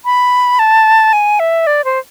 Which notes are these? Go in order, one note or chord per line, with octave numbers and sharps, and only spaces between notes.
B5
A5
G#5
E5
D5
C5